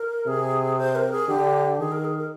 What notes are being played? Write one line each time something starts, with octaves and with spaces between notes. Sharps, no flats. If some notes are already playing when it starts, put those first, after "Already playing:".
Already playing: A#4
C3 G#4
C5
A#4
G#4
D3 G4
D#3 G#4
A#4
G#4
A#4